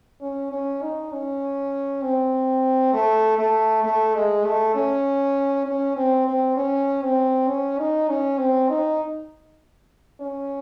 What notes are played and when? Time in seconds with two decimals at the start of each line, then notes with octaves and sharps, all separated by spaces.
0.21 C#4
0.52 C#4
0.81 D#4
1.12 C#4
2.03 C4
2.93 A3
3.38 A3
3.84 A3
4.14 G#3
4.45 A3
4.75 C#4
5.66 C#4
5.96 C4
6.27 C4
6.56 C#4
7.02 C4
7.48 C#4
7.78 D#4
8.09 C#4
8.38 C4
8.69 D#4
10.21 C#4